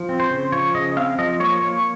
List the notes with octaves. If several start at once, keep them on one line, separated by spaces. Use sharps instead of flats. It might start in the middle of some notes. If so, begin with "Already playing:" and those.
Already playing: F3
C4
C5
C#3
F3 C#5
C#3 D#5
C4 F5
F3 D#5
A#3 C#5
A#3 C#5